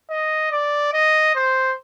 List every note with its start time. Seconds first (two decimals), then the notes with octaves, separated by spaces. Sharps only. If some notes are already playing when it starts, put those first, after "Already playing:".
0.10 D#5
0.51 D5
0.93 D#5
1.35 C5